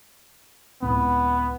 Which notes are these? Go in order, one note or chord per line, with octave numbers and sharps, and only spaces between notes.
C#2 A2 B3 C4